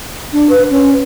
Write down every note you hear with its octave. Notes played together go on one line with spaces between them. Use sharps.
D4
B4
C#4